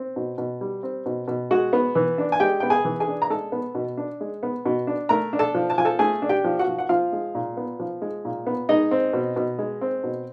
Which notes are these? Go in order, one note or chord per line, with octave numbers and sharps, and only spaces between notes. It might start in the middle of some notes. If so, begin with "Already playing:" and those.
Already playing: C4
B2
B2
G3
C4
B2
B2
G#3 F#4 F#5
B3
E3
D4
G#5
G#3 G4 G5
B3 G5
G#4 G#5
E3
G#4 G#5
D4
A#5
G#3 A4 A5
B3
B2
D4
G#3
B3
B2
D4
A3 A#4 A#5
D4
A4 A5
F3
A5
F3 G#5
A4 A5
A3 G#4 G#5
D4
G4 G5
F3
F#4 F#5
F3
F#5
F3 F4 F5
G#3
A#2
B3
F3
G#3
A#2
B3
G#3 D#4 D#5
C4
B2
B2
G#3
C4
B2